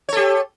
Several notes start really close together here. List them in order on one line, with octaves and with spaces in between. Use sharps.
C#5 A4 G4